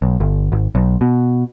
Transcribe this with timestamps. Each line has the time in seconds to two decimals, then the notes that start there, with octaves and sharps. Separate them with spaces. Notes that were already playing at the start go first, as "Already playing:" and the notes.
0.02 B1
0.20 G1
0.52 G#1
0.75 B1
1.01 B2